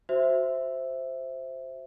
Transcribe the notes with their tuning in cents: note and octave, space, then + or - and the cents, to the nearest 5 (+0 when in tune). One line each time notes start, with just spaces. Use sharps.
F#4 +0 C5 +0 E5 +0